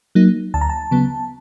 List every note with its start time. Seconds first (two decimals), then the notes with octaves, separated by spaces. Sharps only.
0.15 F#3 A#3 D#4
0.54 D2 A5
0.61 A#5
0.70 A5
0.91 C#3 F#3 B3